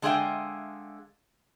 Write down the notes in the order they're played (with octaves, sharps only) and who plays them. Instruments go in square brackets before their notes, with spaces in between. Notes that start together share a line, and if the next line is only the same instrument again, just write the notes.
[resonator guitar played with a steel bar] D3 G#3 G#4 E5 F5 G5